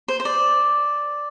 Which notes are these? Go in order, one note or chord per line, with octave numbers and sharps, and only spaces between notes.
C5
C5
D5